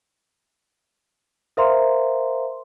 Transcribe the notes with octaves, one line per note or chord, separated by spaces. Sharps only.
A#4 C5 E5 F5 A#5 C6